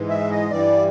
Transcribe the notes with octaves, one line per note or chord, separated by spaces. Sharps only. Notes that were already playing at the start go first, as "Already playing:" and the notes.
Already playing: G#2 E3 G#3
E5
D#5
G2 E3 G3 D5